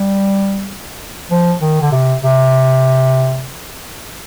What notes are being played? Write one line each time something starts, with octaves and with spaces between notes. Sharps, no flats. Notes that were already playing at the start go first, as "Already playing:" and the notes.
Already playing: G3
F3
D#3
D3
C3
C3